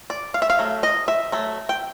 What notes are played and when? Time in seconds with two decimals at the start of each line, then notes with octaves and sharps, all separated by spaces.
0.10 D5
0.34 F5
0.42 E5
0.50 F5
0.59 F#3 A3
0.83 D#5
1.08 E5
1.32 F#3 A3
1.69 G5